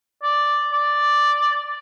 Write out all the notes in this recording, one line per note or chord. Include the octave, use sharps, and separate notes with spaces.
D5
D5